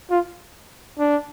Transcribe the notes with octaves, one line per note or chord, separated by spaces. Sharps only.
F4
D4